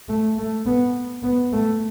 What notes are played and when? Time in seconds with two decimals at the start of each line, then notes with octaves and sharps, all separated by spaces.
0.08 A3
0.38 A3
0.66 B3
1.23 B3
1.52 A3